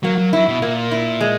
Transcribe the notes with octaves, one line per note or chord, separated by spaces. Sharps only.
F#3 A#3
F#3
F#3 E4
B2
A#2 A#3
E4
G#3